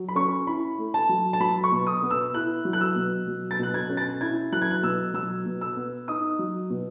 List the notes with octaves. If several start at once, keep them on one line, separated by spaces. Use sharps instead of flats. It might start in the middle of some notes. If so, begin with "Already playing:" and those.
Already playing: F#3
B5
C#4 C#6
E4 B5
A3
A5
F#3
A5
F#3 B5
C#6
B2
D#6
B3
E6
E4 F#6
F#3
F#6
E6
B2
F#3
A6
B2 F#6
G#6
C#4
A6
E4 G#6
F#3 F#6
G#6
F#6
B2 E6
F#3 E6
B2
E6
B3
D#4 D#6
F#3
B2